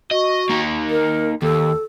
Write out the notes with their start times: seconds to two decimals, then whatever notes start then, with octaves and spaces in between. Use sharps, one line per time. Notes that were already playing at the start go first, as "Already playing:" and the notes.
0.11 F#4 D#5
0.49 A#3 D#4
0.91 A#4
1.42 D#2 A4